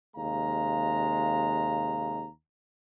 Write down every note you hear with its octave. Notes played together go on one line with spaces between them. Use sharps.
D#2 C3 G#3 F5 A#5